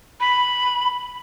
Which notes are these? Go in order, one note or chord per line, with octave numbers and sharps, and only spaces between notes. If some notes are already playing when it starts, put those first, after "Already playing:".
B5